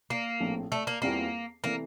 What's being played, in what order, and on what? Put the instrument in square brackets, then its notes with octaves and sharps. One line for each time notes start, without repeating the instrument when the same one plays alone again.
[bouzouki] A#3
[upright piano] A#1 A2 F3 C4
[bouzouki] A3
A#3
[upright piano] E2 E3 G3 C4 F4 [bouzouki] A#3
[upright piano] C3 E3 A3 [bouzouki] A#3